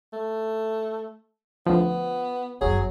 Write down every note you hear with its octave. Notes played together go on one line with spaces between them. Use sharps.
A3
D2 F3 B3
G1 F#2 F#3 G#4